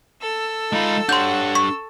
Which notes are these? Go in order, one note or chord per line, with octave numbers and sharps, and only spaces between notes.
A4 E6
G#3 D#4 F4 B5
D4 G4 C#5 F#5 C6 G6
C#6